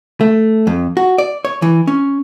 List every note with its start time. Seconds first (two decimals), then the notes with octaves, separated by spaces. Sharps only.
0.21 A3
0.67 F2
0.97 F#4
1.18 D5
1.45 C#5
1.62 E3
1.87 C#4